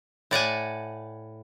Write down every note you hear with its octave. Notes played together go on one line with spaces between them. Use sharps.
A2 D5 F#5 G#5